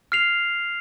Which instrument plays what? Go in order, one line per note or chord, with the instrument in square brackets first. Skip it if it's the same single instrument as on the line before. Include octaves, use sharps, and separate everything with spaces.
[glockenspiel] F6 C7 F7